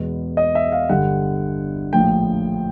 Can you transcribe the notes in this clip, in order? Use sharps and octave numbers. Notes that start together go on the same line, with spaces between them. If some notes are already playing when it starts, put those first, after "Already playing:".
Already playing: E2 B2 G#3 B3
D#5
E5
F5
G1 G2 D3 G3 F#5
A#1 A2 F3 A3 G5